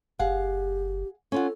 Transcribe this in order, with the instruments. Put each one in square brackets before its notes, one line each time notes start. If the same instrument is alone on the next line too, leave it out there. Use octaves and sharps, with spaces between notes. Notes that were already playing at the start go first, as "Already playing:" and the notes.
[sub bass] F#1 [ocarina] G4 [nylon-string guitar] G#4 F5 F#5
[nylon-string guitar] C#4 F4 F#5 [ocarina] A4